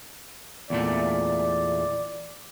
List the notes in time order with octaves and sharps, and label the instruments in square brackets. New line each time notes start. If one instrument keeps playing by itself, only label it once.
[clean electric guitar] E2 A#2 A3 [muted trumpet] D5